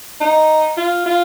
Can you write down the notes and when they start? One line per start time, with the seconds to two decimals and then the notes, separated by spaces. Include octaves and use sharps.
0.21 D#4
0.77 F4
1.06 F4